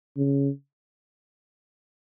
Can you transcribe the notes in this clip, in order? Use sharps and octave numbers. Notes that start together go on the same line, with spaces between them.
C#3